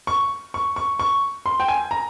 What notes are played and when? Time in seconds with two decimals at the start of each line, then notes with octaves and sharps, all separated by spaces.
0.07 C#6
0.54 C#6
0.76 C#6
0.99 C#6
1.46 C6
1.60 G5
1.68 G#5
1.91 A#5